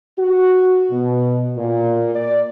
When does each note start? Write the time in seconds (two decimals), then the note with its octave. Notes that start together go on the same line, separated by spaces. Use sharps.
0.18 F#4
0.90 B2
1.56 A#2
2.16 D5